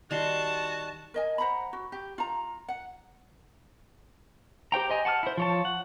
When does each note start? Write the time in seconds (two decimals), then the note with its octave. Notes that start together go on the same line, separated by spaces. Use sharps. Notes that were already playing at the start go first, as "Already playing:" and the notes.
0.11 D#3 G3 F#4 A5 C6
1.14 A#4 D#5 G#5
1.38 C5 F#5 A#5 B5
1.73 F#4
1.92 G4
2.18 F4 A#5
2.68 F#5
4.72 G4 C5 G5 A#5
4.90 C5 D#5 G#5
5.05 F#5 A5 D6 F6
5.23 E4 C5
5.37 F3 C#5 A5
5.65 F#5